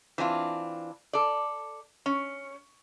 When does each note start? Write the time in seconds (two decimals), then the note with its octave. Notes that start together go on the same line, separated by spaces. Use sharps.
0.18 E3 C4 D4 F4
1.13 A4 D5
2.06 C#4